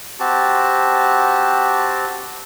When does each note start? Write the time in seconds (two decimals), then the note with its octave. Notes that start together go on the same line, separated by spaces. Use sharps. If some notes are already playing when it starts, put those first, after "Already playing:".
0.20 C4 F#4 G4 A5